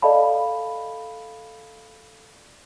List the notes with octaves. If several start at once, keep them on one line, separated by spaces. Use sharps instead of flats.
A4 D5 D#5 F5 A5 B5